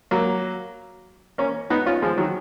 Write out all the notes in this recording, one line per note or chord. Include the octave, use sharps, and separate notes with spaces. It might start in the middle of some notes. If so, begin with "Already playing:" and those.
F#3 A#3
A#3 C#4
B3 D#4
C#4 F4
F3 G#3
D#3 F#3